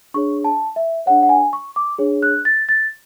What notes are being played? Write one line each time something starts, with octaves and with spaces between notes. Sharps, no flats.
D4 G#4 C#5 C#6
A5
E5
D4 G#4 C#5 F#5
F#5
G#5
C#6
D6
D4 G#4 C#5
F#6
A6
A6